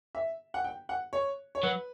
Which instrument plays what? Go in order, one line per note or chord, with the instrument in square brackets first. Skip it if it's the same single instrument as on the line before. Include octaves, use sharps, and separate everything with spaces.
[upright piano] E5
F#5
G5
F#5
C#5
C#5
[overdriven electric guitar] F#3 [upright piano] B4